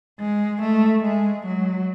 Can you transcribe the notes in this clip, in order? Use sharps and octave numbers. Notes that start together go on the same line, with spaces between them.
G#3
A3
G#3
F#3